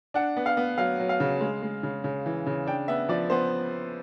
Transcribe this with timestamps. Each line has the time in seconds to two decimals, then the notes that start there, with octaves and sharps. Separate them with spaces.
0.14 D4 F#5
0.37 B3
0.46 F5
0.57 B3
0.78 F#3 F5
0.99 F#3
1.09 F5
1.20 C#3
1.41 G#3
1.62 G#3
1.83 C#3
2.04 C#3
2.26 E3
2.47 C#3
2.67 D4 G5
2.88 B3 E5
3.09 F3 D5
3.30 B3 C5